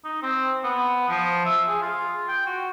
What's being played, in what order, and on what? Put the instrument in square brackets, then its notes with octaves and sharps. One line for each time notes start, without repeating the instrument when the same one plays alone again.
[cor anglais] D#4
C4
B3
F3
E5
G#4
F4
G5
F#4